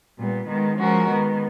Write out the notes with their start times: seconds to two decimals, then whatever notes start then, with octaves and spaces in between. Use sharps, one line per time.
0.19 A#2 G3 B3
0.48 D#3 G#3 B3
0.78 F3 G#3 C#4 F#4 A#4
1.08 D#3 G#3 B3